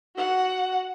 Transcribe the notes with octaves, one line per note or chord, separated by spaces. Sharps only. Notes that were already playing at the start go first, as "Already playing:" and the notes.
F#4 F#5